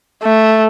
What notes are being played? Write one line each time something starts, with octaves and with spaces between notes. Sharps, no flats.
A3